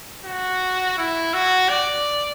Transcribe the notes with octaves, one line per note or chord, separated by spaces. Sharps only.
F#4
E4
F#4
D5